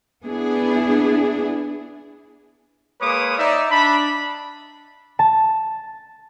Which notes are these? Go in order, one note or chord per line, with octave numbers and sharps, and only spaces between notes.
B3 D4 E4 G#4
G#3 A#3 B4 C#5 D6 D#6
D#4 D5 E5
D4 A5 B5
A5